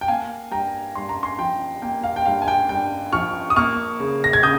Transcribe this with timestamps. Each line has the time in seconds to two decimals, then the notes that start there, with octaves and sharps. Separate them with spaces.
0.01 G5
0.08 A#3 F5 G#5
0.51 G2 G5 A#5
0.95 G2 C6
1.09 A#5
1.23 G#5 C6
1.39 F3 G5
1.82 A#3 G5
2.03 F5
2.16 G5
2.26 G2 F5
2.42 G#5
2.48 G5
2.69 G2 G5
3.12 F3 C#6 F6
3.50 D#6
3.56 A#3 C#6 F6
4.00 C#3
4.24 A#6
4.33 G#6
4.43 C#3 D#6 G6